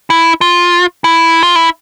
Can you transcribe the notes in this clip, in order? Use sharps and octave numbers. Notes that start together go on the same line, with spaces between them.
E4
F4
E4
F4
E4